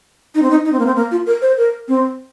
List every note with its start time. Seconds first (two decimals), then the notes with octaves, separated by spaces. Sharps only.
0.35 D#4
0.42 C4
0.51 D#4
0.65 D#4
0.72 C4
0.79 A#3
0.86 C4
0.96 A#3
1.11 F4
1.26 A#4
1.42 C5
1.58 A#4
1.88 C4